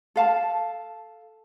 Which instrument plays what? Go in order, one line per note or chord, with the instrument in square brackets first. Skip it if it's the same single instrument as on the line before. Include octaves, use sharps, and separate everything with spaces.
[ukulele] A4 F5 A5